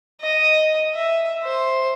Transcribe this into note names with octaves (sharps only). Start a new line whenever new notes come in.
D#5
E5
C5